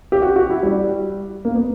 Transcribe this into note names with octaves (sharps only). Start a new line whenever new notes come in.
G4
F#4
F#4
E4
G3
A#3
B3